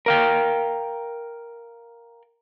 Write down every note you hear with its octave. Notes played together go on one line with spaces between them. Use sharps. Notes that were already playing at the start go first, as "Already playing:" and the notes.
A#4 F5 G5